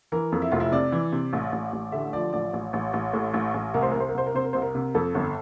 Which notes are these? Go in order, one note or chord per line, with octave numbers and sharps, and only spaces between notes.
E3 A#4
F2
E4
F1 F4
E4
C3 D5
E3
C3
A1
A1
A1
D3 E5
F3 D5
A1 D5
A1
A1
A1
A2
A1
A1
C2 A#4
C5
C2 A#4
C5
A#4
C2 C5
A#4
C3 C5
A#4
C2 C5
A#4
C3
F2 A4
G1